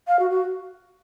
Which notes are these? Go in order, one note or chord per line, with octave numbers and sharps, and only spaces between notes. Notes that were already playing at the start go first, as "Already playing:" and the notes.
F5
F#4
F#4